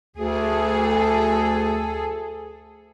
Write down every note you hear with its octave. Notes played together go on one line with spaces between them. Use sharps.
D2 G#4 A4